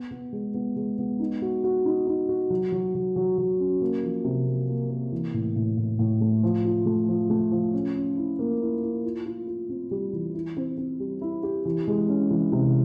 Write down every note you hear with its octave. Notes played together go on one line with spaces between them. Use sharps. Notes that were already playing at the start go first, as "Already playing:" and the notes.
Already playing: B3
B3
G#3
B3
G#3
B3
D#4
F#4
F#4
D#4
D#4
F#4
F#3
F#3
F#3
F#3
F#3
C#4
A#3
F3
C3
A#3
A#3
A#3
E3
A2
A2
A2
A2
A3
F3
F4
A3
F3
A3
F3
C#4
C#4
E4
A#3
E4
E4
F4
F4
F4
C4
G3
E3
E4
C4
C4
G3
E4
G4
E3
G#3
C#4
E3
C3